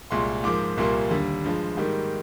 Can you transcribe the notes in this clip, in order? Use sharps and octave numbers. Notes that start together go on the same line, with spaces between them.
C2 A#2 G#3 C6
G#2 F3 A#3 D6
C2 A#2 G3 A#3 C6
D#2 D3 G3
G2 F3 G#3
G#2 D#3 G3 A#3